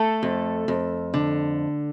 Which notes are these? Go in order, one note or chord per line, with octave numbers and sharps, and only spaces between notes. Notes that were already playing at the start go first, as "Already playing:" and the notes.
Already playing: A3 A4
F2
F2
D3